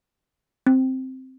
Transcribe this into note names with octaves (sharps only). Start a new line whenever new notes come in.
C4